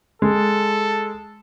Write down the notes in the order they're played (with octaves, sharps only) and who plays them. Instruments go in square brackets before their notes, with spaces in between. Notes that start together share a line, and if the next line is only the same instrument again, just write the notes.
[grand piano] G#3 [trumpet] A4